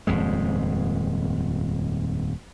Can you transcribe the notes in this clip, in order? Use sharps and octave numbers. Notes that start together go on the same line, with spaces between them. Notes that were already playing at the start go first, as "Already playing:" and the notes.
D#1 F2 G#2 G#3